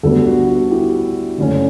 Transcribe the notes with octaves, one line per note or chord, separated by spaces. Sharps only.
D2 D3 G3 B3 F#4 A4
F#4
F#4
E4 G4
F#1 F#2 D3 A3 C#4